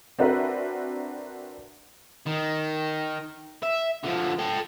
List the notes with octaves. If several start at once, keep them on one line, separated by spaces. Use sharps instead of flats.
C4 D4 F#4 A#4 B4 E5
D#3
E5
D3 F3
A4 G5